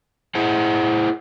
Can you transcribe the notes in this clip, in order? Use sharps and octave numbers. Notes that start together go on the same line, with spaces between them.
E4 G#4 C5 F#5